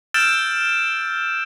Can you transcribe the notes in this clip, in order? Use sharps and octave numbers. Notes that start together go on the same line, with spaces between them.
E6 F6 G6 A6 D7 E7